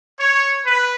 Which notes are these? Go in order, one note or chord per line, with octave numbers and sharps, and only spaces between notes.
C#5
B4